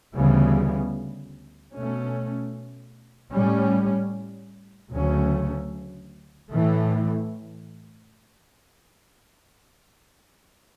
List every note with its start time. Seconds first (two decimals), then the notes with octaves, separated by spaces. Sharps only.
0.15 D2 C#3 E3 G3 B3
1.73 B2 A3 C#4
3.32 A2 G3 C#4
4.92 D2 C#3 F#3 A3 C#4
6.50 A2 E3 A3